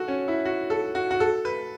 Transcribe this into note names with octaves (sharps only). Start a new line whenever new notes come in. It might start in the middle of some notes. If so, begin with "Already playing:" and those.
Already playing: F#4 A4
C#4
E4
F#4
A4
F#4
F#4
A4
B4